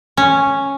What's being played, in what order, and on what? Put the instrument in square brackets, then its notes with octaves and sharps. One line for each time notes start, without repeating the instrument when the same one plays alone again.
[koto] C#4